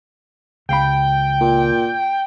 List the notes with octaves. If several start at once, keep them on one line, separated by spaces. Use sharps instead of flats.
C#2 F5 G5 B5
A#2